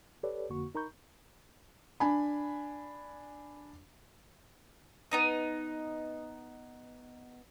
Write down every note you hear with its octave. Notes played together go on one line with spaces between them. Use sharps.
G4 A4 B4 C#5 D5
F2 D3 A#3 F#4 C#6
D#4 A#4 A#5 B5 C#6 G6
D4 G#5 B5
B3 D#4 D#5